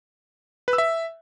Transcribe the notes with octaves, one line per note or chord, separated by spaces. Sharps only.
B4
E6
E5